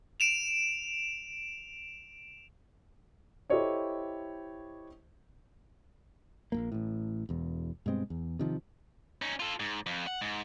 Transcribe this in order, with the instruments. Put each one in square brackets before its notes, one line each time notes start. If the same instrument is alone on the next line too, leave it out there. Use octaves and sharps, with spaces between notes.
[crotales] D7 E7 F7
[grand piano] E4 G4 A4 C5 C#5 D#5
[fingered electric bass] A#1 F#2 A#3
A1 A2
E1 E2
G2 B2 G#3 C4
E2
C3 D#3 F3
[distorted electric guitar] C#4 D#4
F4 A4
G#2
F2
F#5
G#2